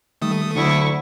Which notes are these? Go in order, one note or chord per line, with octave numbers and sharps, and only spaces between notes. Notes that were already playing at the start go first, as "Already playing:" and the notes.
D#3 G3 A3 D#6
D2 D3 F#3 E4 C#6